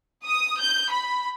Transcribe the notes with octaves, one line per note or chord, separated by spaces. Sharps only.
D#6
G6
B5